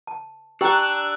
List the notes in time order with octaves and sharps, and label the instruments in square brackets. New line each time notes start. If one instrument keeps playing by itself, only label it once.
[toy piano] A5
[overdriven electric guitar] D4 [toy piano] G4 G5 A#5 [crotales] E6 F#6